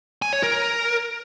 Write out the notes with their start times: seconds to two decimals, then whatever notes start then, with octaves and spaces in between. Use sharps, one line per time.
0.22 G#5
0.33 C#5
0.43 A#4